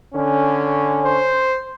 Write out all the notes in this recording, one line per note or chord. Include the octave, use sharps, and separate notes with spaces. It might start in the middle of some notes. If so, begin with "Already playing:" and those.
D3 C#4
C5